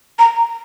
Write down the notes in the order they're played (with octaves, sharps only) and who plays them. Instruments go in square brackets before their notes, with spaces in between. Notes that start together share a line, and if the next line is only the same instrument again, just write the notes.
[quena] A#5